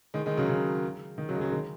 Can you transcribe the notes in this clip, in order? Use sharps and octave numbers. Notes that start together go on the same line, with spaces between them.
D#3 G#3
D#3 G#3
C#3 F#3
C#3
D#3
C#3 F#3
G#3
C#3 F#3
D#3 G#3